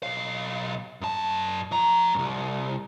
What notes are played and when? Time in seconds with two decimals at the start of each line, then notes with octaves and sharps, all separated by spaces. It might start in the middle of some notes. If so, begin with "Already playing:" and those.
0.03 B1 F5
1.01 F#2 A5
1.71 F3 A#5
2.15 C2 F#2